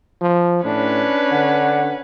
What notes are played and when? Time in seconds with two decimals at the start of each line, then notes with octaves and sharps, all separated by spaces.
0.21 F3
0.64 A2 C#4 D4 B4
1.32 D3 F#5